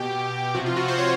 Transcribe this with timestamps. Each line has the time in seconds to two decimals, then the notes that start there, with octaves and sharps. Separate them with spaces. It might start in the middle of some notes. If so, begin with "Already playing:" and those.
Already playing: B2 G4
0.55 C3 F3 F#4
0.66 F4
0.76 F#4
0.88 C5
0.98 C#5